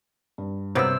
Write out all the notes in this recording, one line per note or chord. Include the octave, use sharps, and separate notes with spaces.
G2
C3 F#3 A#3 B3 C5 E6